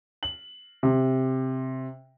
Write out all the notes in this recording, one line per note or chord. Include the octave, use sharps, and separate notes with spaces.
F#7
C3